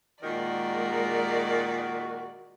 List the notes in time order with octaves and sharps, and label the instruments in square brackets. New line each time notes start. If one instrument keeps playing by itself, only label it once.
[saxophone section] A#2 D#3 [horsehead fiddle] G#3 A#4 [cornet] F#4 [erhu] D5